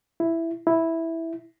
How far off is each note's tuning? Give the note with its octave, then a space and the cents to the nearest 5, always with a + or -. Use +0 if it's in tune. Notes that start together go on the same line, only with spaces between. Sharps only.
E4 +5
E4 -5